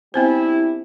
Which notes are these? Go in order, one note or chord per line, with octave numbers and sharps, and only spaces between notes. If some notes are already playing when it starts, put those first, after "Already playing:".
G3 B3 C4 D4 E4 C5